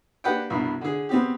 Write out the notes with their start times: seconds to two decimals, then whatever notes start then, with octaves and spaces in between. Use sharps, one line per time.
0.24 A#3 D4 G4 B4 F#5 G5
0.50 C2 G2 B2
0.81 D3 G#4
1.09 B3 C4 G4